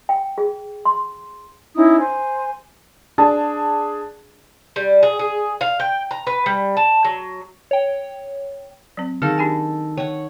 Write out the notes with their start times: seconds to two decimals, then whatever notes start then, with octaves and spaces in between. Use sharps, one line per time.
0.09 G5
0.38 G#4
0.85 C6
1.75 C#4 D#4 E4 D#6
2.00 C5 G#5
3.18 D4 G#4 A5
4.76 G3
5.03 G#4
5.19 G#4
5.61 F5
5.80 G5
6.11 A#5
6.27 B4
6.46 G3
6.77 A5
7.05 F#3
7.71 C#5 G5
8.97 F#3 C4
9.22 D#3 G#4 A4 F5 F#5
9.38 D4 G4 G#5
9.97 C#5 F#5 G5